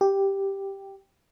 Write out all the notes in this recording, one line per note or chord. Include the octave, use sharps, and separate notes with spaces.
G4